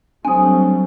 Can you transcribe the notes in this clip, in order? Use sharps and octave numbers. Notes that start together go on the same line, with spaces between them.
F#3 G3 A3 C4 D4 C5 G#5 D#6